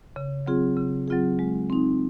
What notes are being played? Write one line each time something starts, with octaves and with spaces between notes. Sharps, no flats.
C#3
F#3 C4 F4 G#4
C#3
F#3 C4 F4 G#4
G#3
C4 D#4